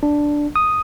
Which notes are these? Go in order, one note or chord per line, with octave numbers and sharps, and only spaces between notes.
D4
D#6